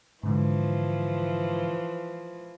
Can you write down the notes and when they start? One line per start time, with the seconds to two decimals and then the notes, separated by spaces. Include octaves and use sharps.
0.23 G#2 D3 E3 F3